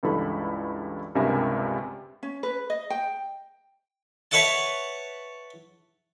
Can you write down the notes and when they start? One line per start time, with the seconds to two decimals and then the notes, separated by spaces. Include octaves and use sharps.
0.03 C#2 G2 E3 A4 B5
1.15 C#2 G2 C3 A#4 E5 G#5
2.23 C#4
2.43 B4
2.70 D#5
2.90 G5
4.31 B4 C#5 E5 F#5 A5